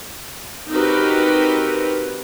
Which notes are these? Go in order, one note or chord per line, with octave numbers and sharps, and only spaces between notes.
C4 D#4 F#4 G4 A#4 B4